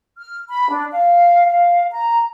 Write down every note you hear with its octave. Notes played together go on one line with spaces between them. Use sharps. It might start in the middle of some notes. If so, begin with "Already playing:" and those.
F6
B5
D4
F5
F5
A#5